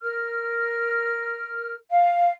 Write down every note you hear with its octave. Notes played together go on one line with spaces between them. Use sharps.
A#4 F6
F5